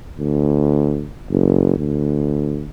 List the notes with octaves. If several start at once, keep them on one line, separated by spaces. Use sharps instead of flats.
D2
F#1
D2